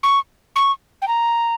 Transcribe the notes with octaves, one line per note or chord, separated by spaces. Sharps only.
C#6
C#6
G5
A#5